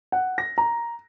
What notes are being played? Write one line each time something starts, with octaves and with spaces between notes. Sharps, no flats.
F#5
A#6
A#5